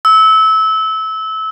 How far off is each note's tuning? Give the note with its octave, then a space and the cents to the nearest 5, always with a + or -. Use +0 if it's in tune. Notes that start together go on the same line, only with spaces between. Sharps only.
E6 -25